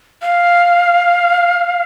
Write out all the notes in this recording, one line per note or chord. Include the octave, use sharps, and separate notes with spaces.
F5